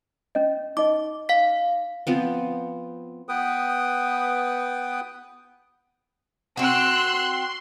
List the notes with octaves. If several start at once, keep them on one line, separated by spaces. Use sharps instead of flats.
C#4 D#5
D#4 D#5 D6
F5 B6
F3 B3 C4
B3 B4 G5 D#6
C4 F#4 C6 E6 F#6